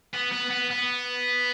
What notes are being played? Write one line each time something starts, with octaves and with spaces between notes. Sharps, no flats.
B3
B3
B3
B3